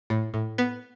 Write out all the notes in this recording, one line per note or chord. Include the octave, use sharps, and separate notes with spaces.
A2
A2
B3